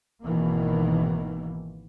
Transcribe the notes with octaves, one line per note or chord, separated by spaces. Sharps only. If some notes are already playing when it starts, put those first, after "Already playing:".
G#1 B2 D#3 E3 A#3